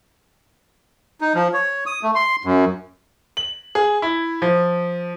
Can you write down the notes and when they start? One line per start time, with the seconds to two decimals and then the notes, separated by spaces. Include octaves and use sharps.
1.21 D#4
1.35 F3
1.53 C#5
1.86 D#6
2.03 A3
2.15 C6
2.44 F#2
3.37 F#7
3.75 G#4
4.02 E4
4.42 F3